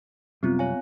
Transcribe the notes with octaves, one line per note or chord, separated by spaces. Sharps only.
F#2 C3 G3 B3 C4 F4
C#5 F5 G#5